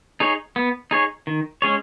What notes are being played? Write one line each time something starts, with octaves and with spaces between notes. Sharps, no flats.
D#4 G#4 C#5
B3
D#4 G#4 C#5
D#3
G#3 C#4 G#4 C#5